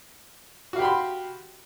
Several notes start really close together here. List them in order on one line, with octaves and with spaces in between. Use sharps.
F#4 F5 G4 B5 C6